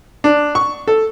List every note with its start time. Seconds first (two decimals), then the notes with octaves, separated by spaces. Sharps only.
0.24 D4
0.55 C#6
0.88 A4